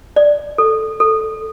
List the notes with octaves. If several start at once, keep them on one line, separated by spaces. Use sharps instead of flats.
D5
A4
A4